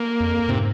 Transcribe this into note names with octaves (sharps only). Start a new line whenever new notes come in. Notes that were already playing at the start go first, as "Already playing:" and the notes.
Already playing: A#3
F2
G#2 C3